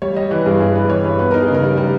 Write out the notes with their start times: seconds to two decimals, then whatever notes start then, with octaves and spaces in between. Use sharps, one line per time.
0.02 G3 C#5
0.16 G3 D#5
0.31 E3 B4
0.46 G2 G#4
0.60 G2 G#4
0.75 G3 B4
0.90 E3 C#5
1.04 G2 B4
1.19 B3 B4
1.31 D#4 A#4
1.42 G#4
1.48 C#3
1.55 A#4
1.63 G3
1.77 G3